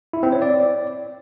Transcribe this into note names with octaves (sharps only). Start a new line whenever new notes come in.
E4
C4
C#5
D5